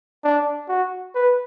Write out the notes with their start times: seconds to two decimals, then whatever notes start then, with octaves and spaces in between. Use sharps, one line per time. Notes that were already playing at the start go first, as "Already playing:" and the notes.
0.24 D4
0.69 F#4
1.15 B4